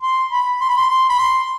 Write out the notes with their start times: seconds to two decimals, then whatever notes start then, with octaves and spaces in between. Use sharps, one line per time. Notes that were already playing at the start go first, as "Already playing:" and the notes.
0.02 C6
0.32 B5
0.61 C6
0.69 B5
0.77 C6
0.90 C6
1.09 B5
1.19 C6